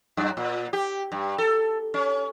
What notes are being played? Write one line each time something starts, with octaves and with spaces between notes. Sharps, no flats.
F#2
A#2
G4
G2
A4
C#4